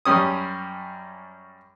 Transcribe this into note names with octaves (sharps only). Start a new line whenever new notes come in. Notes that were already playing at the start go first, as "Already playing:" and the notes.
F#2 G3 C#4 D#6